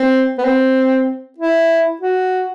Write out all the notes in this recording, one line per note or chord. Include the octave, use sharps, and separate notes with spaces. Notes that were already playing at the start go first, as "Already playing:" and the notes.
Already playing: C4
B3
C4
E4
F#4